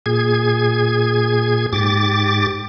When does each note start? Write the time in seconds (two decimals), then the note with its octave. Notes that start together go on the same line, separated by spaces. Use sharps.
0.06 A#2 G#4 G#6
1.73 G#2 G4 D6 A6